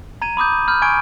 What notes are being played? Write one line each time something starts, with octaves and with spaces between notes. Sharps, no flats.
A#5 G#6 D#7
B5 D6 D#6 G6
B5 F6 G6
G#5 C#6 G#6 D7